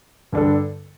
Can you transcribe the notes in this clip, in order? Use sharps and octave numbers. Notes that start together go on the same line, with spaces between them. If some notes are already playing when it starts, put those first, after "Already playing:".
G2 D3 G3 D4 A4